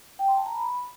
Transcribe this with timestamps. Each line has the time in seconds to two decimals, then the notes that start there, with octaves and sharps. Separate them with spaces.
0.19 G5
0.28 C6
0.37 A5
0.46 A#5
0.55 B5